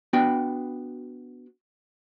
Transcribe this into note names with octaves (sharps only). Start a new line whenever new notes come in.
B3 D4 F#4 G5